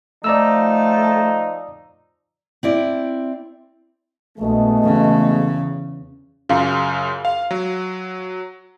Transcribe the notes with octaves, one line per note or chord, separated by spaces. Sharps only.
F3 A3 D#4 D5 A#5 E6
C4 E4 D5
A#1 B2 G#3 A3
E2 C#3
F#2 C#3 F4
F5
F#3